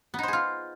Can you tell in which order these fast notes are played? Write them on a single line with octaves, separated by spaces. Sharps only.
B3 D#4 C5 G#4 F4